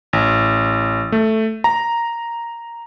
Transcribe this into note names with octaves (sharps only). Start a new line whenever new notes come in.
A1
A3
A#5